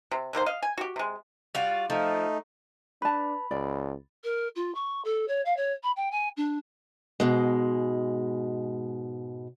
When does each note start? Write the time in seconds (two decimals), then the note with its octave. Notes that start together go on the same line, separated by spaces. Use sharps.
0.11 C3
0.33 D3 D#3 A#3 C5
0.46 D#5 F5
0.62 G#5
0.78 F#4 G4
0.96 C3 G#3
1.55 G3 F4 F#4
1.90 F3 A3 D#4
3.02 D4 B4 A5 B5
3.51 C#2 D5
4.24 A#4
4.56 F4
4.75 C#6
5.04 A4
5.28 C#5
5.45 F5
5.57 C#5
5.83 B5
5.96 G5
6.11 G#5
6.37 D4
7.20 G#2 B2 G#3